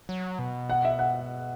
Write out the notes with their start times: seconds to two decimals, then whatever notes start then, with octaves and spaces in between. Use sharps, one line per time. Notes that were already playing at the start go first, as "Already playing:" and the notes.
0.09 F#3
0.39 B2
0.69 F#5
0.85 E5
0.99 F#5